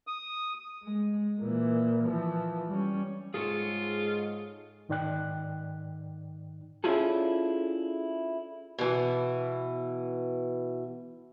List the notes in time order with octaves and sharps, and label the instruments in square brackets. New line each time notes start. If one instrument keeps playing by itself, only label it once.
[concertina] D#6
[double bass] G#3
A#2 E3
E3 F3
G3 C#4
[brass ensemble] G#2 G#3 [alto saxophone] F4 [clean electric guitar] G#4 A4 C#5
[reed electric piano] G#2 D#3 D#4 D5 G5 F#6
[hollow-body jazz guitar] C#4 D4 E4 F4 G#4 A4
[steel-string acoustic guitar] B2 E3